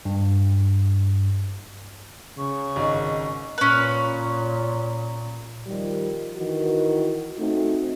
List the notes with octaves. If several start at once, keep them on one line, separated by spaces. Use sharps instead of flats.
G2
C#3 C#6
G#1 D#5
A#2 C#4 B4
D#3 F3 G3
D#3 E3 F#4
A3 C4 D#4 F#4